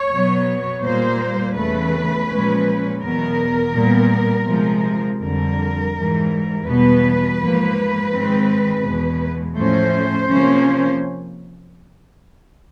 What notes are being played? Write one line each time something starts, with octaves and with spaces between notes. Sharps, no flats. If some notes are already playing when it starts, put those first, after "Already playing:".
Already playing: C#5
B2 F#3 B3
A#2 G3 A#3 C5
E2 C#3 E3 A3 B4
A#2 F3 G#3 C#4
E2 B2 F#3 B3 A#4
A#2 G3 B3
C3 F3 G#3
F2 D3 G3 A#4
G#2 E3 G3
E2 B2 G3 B3 B4
G#2 F3 A#3
G#2 D#3 G#3 C4
E2 B2 G#3
A2 F3 A3 C#4 C5
C3 F3 A#3 C#4